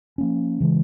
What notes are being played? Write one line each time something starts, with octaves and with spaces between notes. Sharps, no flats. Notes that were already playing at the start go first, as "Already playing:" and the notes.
F3 A#3 C#4
C#3 E3 G#3